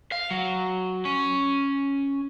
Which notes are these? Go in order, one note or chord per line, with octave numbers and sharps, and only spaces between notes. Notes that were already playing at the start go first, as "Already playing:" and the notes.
F5
F#3
C#4